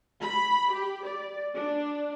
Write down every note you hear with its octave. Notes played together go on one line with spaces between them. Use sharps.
B5
G4
D5
D4